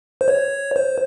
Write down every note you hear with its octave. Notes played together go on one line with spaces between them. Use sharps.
C5
C#5
C5